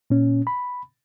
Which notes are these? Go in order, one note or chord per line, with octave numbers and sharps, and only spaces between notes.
A#2 C#4
B5